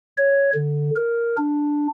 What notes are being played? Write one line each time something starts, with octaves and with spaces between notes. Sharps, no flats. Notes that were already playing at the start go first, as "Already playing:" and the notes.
C#5
D3
A#4
D4